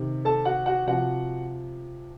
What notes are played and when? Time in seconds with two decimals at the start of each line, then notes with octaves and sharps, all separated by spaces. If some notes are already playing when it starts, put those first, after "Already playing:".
Already playing: C3 D#3
0.25 A4 A5
0.45 F#4 F#5
0.66 F#4 F#5
0.87 C3 F3 F#4 F#5